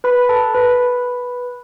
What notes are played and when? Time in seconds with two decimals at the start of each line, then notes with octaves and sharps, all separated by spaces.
0.04 B4 B5
0.29 A4 A5
0.54 B4 B5